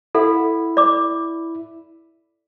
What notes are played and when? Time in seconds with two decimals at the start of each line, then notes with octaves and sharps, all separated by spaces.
0.15 E4 A4 F#5
0.77 D5 D6